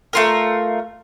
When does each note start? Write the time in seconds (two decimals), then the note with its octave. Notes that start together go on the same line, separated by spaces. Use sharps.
0.13 A3 C#4 F4 A#4